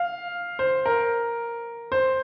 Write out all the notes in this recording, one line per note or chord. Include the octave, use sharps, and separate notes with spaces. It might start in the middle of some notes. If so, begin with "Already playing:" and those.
Already playing: F5
C5
A#4
C5